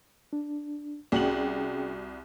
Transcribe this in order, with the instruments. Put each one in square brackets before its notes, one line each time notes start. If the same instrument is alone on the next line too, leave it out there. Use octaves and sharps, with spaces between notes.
[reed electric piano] D4
[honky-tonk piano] C2 F#4 F#7 [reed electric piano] C#4 G#4 G5